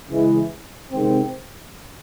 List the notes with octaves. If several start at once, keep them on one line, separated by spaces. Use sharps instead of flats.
C#3 E3 G#3
C3 D#3 G#3 C4